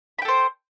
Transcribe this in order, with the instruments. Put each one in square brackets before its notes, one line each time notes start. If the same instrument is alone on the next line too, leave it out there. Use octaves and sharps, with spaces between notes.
[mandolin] B5
G5
A4
C5